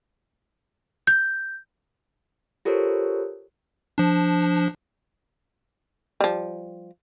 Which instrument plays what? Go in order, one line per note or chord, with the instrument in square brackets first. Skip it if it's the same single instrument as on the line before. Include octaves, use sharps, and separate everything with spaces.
[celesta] G6
[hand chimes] F4 G4 A4 A#4 C5 C#5
[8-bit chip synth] F3 D4
[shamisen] F3 G3